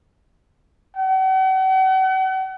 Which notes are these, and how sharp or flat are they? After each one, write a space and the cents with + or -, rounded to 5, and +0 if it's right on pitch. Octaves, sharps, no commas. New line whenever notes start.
F#5 +40